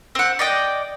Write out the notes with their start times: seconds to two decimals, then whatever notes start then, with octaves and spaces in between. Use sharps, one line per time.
0.15 C4 F#5
0.39 D5 D#5 G5